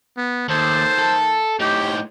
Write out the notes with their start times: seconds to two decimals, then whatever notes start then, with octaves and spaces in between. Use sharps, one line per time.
0.17 B3
0.50 D#2 D#3 A3 C5 A5
0.99 A4
1.60 A2 D#4 G4 C#5 G5 D6